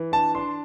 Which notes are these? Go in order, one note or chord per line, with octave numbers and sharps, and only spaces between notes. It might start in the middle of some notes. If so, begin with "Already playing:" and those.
Already playing: E3
D4 A5
D4 C6